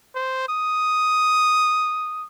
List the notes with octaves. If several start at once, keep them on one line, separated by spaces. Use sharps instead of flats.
C5
D#6